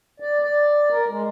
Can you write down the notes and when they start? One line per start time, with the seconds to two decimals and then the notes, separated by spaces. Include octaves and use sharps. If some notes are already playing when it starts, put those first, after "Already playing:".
0.20 D5
0.42 D5
0.91 A#4
1.09 G#3